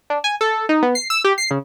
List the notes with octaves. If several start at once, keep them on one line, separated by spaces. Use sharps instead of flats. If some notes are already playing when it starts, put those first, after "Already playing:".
D4
G#5
A4
D#4
B3
C7
E6
G4
C7
C#3